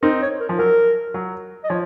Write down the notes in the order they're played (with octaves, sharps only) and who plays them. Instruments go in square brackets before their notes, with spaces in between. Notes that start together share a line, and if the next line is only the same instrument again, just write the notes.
[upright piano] C4 D#4 [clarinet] A#4
[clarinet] C#5
A#4
[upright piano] F3
[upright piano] F#3 [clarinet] A#4
[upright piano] F#3
[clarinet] D#5
[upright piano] F3 [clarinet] C#5